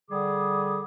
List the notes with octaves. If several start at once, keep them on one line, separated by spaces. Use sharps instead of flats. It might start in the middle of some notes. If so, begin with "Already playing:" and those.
D3 G3 G#4 D6 D#6